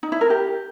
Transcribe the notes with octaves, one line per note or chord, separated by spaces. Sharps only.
D#4
E4
A#4
G4